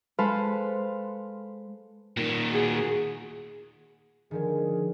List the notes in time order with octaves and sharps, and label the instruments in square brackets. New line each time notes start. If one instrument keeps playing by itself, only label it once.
[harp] G#3 A4 B4 C5 F5
[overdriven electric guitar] A#2 D#3
[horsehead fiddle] F#4 G#4
[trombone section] D3 G#4 [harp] D#3 F3 G#3